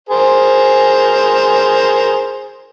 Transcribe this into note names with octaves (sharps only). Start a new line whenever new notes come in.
G#4 A#4 C5